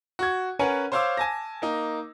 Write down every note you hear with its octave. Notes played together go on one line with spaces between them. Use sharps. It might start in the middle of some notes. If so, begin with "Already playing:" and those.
F#4 C#6 G#6
C#4 A#4 B4 C#5 F#5 G#5
C5 C#5 F5 C6 D6 E6
G#5 A5 A#6
A#3 D#4